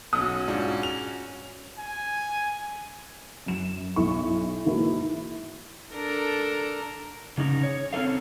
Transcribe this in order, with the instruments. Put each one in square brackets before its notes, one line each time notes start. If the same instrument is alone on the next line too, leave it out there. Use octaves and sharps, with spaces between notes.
[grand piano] B1 D#6 E6 [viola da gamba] C#4 F#4
[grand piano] G#2 D4 F4
F7
[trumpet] G#5
[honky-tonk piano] F#2 E7
B1 E4 C#6
G#2 E3 A#3 E4 F#4
[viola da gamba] D4 A4 A#4
[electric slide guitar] C#3 C#4 D#4
C#5
C4 C#4 D#4 A4 F5